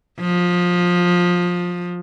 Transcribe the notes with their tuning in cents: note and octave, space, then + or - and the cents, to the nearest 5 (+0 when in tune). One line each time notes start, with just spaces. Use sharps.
F3 +20